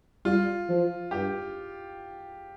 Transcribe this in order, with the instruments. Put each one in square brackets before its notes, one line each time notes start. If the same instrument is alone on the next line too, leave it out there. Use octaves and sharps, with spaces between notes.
[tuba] G3 [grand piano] F4
[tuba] F3
[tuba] G2 [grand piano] G4